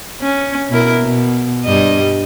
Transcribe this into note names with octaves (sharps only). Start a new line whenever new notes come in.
C#4
B2 E4 A#4
B2
G2 G3 D#5